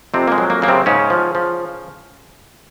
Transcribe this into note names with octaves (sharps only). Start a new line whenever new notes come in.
F2 C3 C4
A#3
G#3
F#3
A#3
C#3 A#3
C3 C4
G#2 C#3 C#4
F3
F3